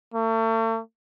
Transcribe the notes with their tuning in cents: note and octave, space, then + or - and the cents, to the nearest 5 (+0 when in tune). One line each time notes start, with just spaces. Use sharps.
A3 +40